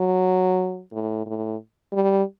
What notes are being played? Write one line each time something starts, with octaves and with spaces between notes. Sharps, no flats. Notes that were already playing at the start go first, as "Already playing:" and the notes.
Already playing: F#3
A2
A2
G3